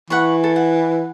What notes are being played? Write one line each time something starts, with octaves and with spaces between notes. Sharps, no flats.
E3 F#5 B5 C#6
A4
F#5